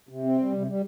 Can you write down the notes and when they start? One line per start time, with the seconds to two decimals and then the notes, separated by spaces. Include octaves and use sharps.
0.09 C3
0.24 C4
0.38 G3
0.52 C3
0.67 G3